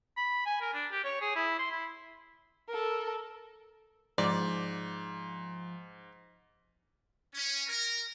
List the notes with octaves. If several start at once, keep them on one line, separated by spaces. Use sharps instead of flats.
B5
G#5
A#4
D4
G4
C#5
G#4
E4
C6
E4
A4 A#4
G#2 F3 D5
C#4
A#4